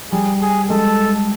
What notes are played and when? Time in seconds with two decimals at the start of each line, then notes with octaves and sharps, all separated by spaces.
0.12 G3 G#4
0.42 G#4
0.70 G#3 A4